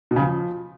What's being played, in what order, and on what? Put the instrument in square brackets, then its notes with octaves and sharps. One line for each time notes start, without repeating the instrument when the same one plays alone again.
[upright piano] B2
C#3
F3